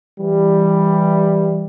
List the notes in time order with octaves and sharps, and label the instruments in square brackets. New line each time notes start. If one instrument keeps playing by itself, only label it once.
[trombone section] E3 G3